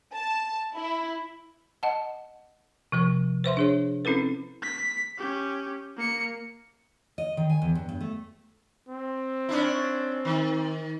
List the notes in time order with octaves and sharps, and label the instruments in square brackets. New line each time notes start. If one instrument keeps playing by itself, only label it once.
[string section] A5
E4
[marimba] D#5 F#5 A5
C3 F3 C#6
B4 C5 E5 C6
D4 G#4 C#5
C4 C#4 E4 A4 B4
[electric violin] B6
C#4 G4
A#3 C#7
[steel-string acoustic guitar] D#5
D#3
G#5
E2
G2
G2
A3
[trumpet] C4
[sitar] C#4 D4 E4
D#3